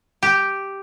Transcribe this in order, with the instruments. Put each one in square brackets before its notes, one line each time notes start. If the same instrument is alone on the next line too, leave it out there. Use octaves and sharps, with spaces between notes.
[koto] G4